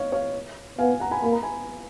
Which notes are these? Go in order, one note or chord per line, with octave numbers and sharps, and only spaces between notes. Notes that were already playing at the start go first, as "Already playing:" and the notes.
Already playing: C#5 D#5 F5
C#5 F5
B3 F5 G#5
F#5 A#5
G#5 B5
A#3 B5
A#5
G#5 B5